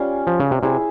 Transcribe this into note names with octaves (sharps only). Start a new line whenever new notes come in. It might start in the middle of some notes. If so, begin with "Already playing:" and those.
Already playing: G3 C#4 F4 G4
F3
C#3
C3
C3 E4 G#4 E5